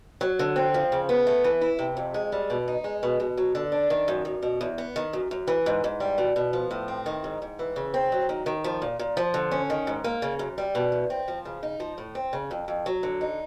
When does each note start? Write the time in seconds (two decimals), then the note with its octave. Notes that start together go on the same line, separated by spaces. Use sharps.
0.21 F#3
0.39 D3
0.56 C4
0.74 F3
0.92 C#3
1.09 B3
1.27 A3
1.44 E3
1.61 E4
1.79 C3
1.97 F2
2.14 G#3
2.32 G3
2.50 B2
2.68 D#4
2.84 G#3
3.03 B2
3.20 B2
3.38 F#3
3.55 D3
3.72 D4
3.90 D#3
4.08 F#2
4.25 F#2
4.43 B2
4.61 E2
4.78 B3
4.96 D#3
5.13 F#2
5.31 F#2
5.47 E3
5.66 G#2
5.84 G#2
6.00 G3
6.18 B2
6.36 B2
6.53 F3
6.71 A2
6.88 C4
7.06 D#3
7.24 G#2
7.42 G#2
7.59 E3
7.76 C#3
7.94 C4
8.12 F#3
8.29 D#3
8.46 D#3
8.64 F3
8.82 A#2
8.99 A#2
9.17 F3
9.34 D3
9.51 C#4
9.70 D#3
9.87 G#2
10.04 A#3
10.22 C#3
10.39 F#2
10.58 G3
10.75 B2
10.92 E2
11.10 C4
11.28 F3
11.45 C#3
11.63 D#4
11.80 F3
11.98 A2
12.15 C4
12.33 C#3
12.51 F2
12.68 F2
12.86 F#3
13.03 D3
13.21 D#4